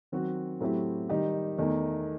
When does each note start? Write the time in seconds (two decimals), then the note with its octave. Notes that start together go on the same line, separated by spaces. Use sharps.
0.12 D#3 F#3 C4 F#4
0.60 A2 F#3 C4 E4 G4
1.09 D#3 G3 D#4 G4
1.58 E2 D#3 A3 D#4